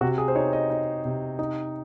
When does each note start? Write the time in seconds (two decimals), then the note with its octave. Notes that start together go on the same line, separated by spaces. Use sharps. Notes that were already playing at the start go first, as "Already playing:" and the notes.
0.01 C3 F#4
0.18 G#4
0.28 C5
0.35 D#4 C#5
0.53 D#5
0.70 D#4
1.05 C3
1.39 D#4